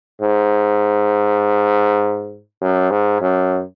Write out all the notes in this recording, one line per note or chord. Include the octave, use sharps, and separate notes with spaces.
G#2
F#2
G#2
F#2